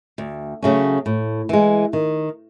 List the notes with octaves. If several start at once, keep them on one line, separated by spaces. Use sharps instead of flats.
D2
C#3 F#3 A3 C#4
A2
E3 G#3
D#3